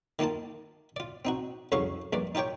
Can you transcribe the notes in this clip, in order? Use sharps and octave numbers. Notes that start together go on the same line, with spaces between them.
D#3 A#3 D#4 F4 A5
F4 D5
C4 D#4 F#4
C2 F2 C#3 F#3 F5 C#6
A#1 G2 D5
D#4 F4 G4 C#5 G5